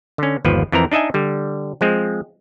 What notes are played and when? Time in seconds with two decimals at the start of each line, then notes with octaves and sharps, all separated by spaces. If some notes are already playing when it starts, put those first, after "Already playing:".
0.18 D3 C#4
0.45 G1 D#2 F3 B4
0.72 F2 E3 C4 A#4 A#5
0.92 D4 D#4 D#5 E5 G#5
1.14 D3 G3
1.81 F3 G#3 C4